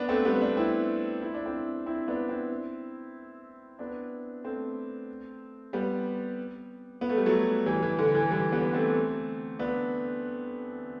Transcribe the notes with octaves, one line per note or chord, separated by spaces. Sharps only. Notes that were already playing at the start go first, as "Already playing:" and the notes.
Already playing: B3 D4
A3 C4
G3 B3
B3 D4
C4 E4
E4
D4
C4 E4
C4 E4
B3 D4
C4 E4
B3 D4
A3 C4
G3 B3
B3
A3
G3
F#3 A3
E3 G3
E3
D3
E3
E3 G3
G3 B3
A3 C4
B3 D4